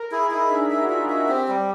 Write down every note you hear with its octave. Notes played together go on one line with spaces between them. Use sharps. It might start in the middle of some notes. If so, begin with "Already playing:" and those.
Already playing: A#4
E4 G#4
D#4 E4
D4 E5
E4 E5
F#4
F4 E5
F#4 E5
C4 G4
G3